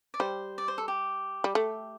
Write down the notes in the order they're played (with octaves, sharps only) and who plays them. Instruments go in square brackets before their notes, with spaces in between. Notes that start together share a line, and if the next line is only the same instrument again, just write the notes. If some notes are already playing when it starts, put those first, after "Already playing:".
[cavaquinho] D5
[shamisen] G3 [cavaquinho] C5
[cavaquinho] D5
C5
A4
G4
[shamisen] G3
A3